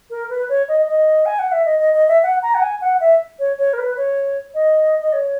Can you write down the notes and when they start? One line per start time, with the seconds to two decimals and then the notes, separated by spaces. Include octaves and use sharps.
0.10 A#4
0.30 B4
0.49 C#5
0.68 D#5
0.88 D#5
1.26 G#5
1.39 F#5
1.52 E5
1.65 D#5
1.79 D#5
1.94 D#5
2.08 E5
2.23 F#5
2.42 A#5
2.55 F#5
2.62 G#5
2.81 F#5
3.00 E5
3.39 C#5
3.59 C#5
3.73 A#4
3.78 B4
3.97 C#5
4.54 D#5
5.01 D#5
5.13 C#5